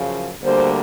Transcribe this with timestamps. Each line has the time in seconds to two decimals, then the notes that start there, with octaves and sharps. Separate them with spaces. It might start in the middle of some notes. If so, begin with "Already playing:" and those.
Already playing: F#2 C#3 F3
0.43 D2 D3 G3 A#3 C5